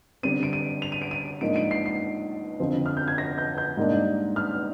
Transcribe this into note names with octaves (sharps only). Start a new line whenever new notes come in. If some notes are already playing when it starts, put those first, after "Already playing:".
D3 G3 C4 D#7
D7
D#7
F7
D#7
D7
D#7
G#2 F3 A#3 D4 D7
D7
C7
C7
F2 D3 F3 C4
F6
G6
G#6
A#6
G6
G6
G#2 G3 A#3 D4
F6